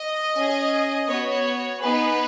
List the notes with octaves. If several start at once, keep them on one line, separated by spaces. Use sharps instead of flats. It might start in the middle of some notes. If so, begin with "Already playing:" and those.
Already playing: D#5
C#4
G#4
B3 F#4 C#5
B3 D#4 G#4 B4